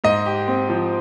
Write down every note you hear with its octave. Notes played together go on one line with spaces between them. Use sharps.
G#2 D#5
G4
C4
F3